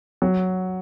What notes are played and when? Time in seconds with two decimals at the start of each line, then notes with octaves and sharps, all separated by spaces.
0.22 F#3